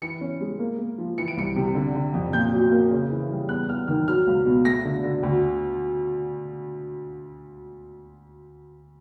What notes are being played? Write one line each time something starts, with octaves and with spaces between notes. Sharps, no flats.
E3 C#7
C#4
G#3
A#3
A#3
F3
E3 C#7
D7
C2 C#7
C3
D3
D3
F2
A#2 G6
F#3
A#3
C#3
E3
G3
E2 F#6
E2 F6
D#3 F6
F#3 F6
C#2
B2
A3 A#6
D3
D3
D2